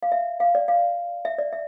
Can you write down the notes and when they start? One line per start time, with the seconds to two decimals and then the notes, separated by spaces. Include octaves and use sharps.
0.03 F5
0.12 E5
0.40 F5
0.55 D5
0.68 F5
1.25 E5
1.38 D5
1.53 E5